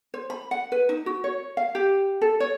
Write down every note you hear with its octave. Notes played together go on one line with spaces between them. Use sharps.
C5
B5
F#5
B4
D#4
F#4
C#5
F5
G4
A4
C#5